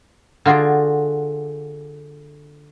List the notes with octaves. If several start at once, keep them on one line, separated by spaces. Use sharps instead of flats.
D3 F4 F#4 G#4 D5